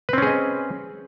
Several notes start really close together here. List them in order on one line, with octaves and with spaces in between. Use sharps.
B4 C4 C#4 G#4 D#5